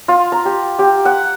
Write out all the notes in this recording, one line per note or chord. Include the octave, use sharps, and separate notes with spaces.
F4
A#5
G4
G4
F#5